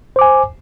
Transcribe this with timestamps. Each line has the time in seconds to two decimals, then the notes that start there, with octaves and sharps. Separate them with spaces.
0.16 C5
0.19 D6
0.21 G#5